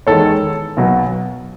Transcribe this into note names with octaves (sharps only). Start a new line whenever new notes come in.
E2 D#3 G#3 A4 C#5
B1 B2 F#3